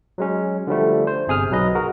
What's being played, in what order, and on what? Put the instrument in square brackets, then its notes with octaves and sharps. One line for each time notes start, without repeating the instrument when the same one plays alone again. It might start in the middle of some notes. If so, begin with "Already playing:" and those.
[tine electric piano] F#3 G#3 C#4
D3 F3 G3 A3
C5
G1 C3 G#4 D#6 F6
B1 F#3 B4 D#5
F#4 G#4 A#4 A#5